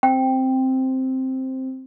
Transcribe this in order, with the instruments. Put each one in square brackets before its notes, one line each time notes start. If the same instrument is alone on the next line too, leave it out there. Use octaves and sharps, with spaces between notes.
[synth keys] C4 [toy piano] G5